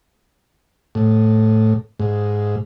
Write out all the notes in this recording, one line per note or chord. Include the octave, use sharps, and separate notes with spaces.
A2
G#2